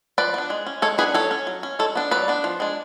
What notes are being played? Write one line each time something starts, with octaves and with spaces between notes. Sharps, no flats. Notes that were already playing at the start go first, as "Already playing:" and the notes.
F3 B4 D5
B3 D4
G#3
C#4
G#3 A4 C#5
B3 D4 G#4 B4
F#3 A4 C#5
C#4
F#3
C#4
G#3 A4 C#5
B3 D4
F#3 B4 D5
B3 D4
F3
G#3 D4